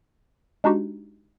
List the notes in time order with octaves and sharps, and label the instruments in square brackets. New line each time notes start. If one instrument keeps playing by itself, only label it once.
[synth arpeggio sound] G#3 D4 D#4 F#4 G4